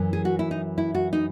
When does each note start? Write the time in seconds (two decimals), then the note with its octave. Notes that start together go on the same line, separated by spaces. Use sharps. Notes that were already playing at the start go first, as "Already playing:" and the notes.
Already playing: F#2 E3
0.13 G#4
0.25 F#4
0.39 E4
0.51 D#4
0.78 E4
0.95 F#4
1.13 D#4